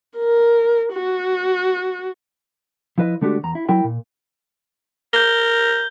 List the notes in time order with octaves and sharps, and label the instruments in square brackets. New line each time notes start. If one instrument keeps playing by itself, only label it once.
[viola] A#4
F#4
[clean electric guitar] F3 E4 B4 D#5
D3 G#3 A3 D4 F#4 G4
E2 A#5
E4
F#3 E4 A#4 G5
A#2
[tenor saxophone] A#4 [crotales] G6 G7